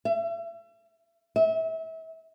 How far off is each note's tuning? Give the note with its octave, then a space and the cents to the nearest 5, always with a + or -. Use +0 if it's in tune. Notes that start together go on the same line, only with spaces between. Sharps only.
E5 +40
E5 -30